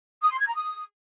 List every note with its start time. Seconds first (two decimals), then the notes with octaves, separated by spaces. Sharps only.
0.22 D#6
0.30 C6
0.39 G#6
0.47 A#5
0.55 D#6